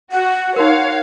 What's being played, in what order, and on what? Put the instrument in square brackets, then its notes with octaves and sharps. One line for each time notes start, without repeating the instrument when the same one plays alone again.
[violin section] F#4 [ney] F#5
[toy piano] D#4 F#4 A#4 [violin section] C#5 F5